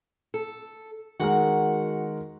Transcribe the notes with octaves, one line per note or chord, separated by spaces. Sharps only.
A4
D#3 G#3 F#4 A#4 F#5